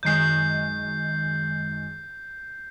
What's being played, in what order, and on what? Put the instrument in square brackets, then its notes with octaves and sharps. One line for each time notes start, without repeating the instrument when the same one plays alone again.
[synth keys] F#2 D#3 G#3 [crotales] G6 C7